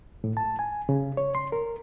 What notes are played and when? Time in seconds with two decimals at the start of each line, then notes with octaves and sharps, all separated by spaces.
0.24 A2
0.37 A5
0.59 G#5
0.89 C#3
1.17 C#5
1.35 C6
1.52 A#4